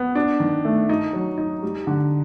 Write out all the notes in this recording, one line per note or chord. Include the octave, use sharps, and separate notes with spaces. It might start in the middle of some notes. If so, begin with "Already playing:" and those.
Already playing: B3
D4
D#3
A3
D#4
F#3
D#4
G3
D3